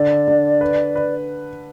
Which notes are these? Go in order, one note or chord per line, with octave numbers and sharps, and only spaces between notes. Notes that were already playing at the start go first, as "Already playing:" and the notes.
Already playing: D3 D5
D3
B4
B4